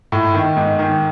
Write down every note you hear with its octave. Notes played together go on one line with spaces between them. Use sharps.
A2
D#3
G#2
D#3